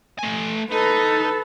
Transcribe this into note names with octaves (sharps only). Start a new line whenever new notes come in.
A3 G#5
D#4 A4 B4